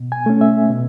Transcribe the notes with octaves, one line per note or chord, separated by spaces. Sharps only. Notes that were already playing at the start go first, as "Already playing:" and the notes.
Already playing: B2
G#5
A3 C#4
E5
B2